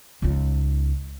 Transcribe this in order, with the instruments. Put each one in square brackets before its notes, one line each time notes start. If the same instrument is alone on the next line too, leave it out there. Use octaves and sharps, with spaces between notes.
[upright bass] C#2 D#4